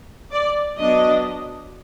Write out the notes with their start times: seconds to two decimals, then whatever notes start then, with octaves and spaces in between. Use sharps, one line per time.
0.31 D5
0.77 F#3 B3 D4 D#5